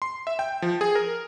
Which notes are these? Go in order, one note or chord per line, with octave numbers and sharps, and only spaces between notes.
C6
E5
G5
F3
G#4
A#4